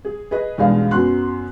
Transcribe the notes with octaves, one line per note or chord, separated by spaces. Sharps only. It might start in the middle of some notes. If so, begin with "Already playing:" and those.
G#4
G#4 B4 D#5
B1 E2 G3 G#3 D4 F5
F#2 F#3 B3 C6 F#6